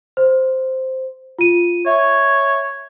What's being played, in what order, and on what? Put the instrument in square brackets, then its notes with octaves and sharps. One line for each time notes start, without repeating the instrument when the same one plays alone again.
[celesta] C5
F4 D#7
[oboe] C#5 [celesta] E5